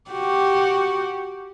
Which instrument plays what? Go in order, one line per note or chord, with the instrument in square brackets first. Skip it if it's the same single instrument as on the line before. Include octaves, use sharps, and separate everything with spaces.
[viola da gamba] F#4 G4